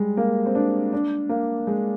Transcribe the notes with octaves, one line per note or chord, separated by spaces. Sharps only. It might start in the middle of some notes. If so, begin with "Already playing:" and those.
Already playing: G3 G#3
A#3
C4
D4
D4
A#3
G#3